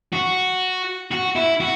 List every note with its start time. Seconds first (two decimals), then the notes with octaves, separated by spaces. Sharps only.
0.13 F#4
1.11 F#4
1.35 E4
1.60 F#4